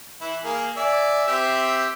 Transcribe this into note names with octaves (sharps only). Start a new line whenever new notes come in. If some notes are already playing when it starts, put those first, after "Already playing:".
E3 E4
A#3 G#4
D5 E5 G#5
C4 G4 E5